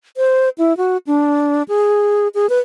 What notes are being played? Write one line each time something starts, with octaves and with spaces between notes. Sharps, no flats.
C5
E4
F#4
D4
G#4
G#4
B4